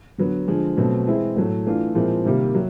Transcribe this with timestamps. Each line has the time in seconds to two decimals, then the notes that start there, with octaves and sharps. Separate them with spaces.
0.18 D3 F#3 B3
0.48 D3 F3 G#3
0.77 B2 F#3 A3 C4
1.07 E3 G#3 C4 E4
1.36 A2 F#3 A3
1.66 E3 A3 D4 F4
1.95 A#2 F3 G#3 C4 E4
2.25 C3 D#3 G3 A#3
2.55 F#3